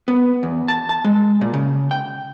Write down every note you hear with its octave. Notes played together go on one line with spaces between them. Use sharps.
B3
E2
A5
A5
G#3
A#2
C#3
G5